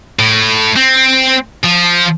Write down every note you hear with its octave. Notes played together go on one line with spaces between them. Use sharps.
A2
C4
F3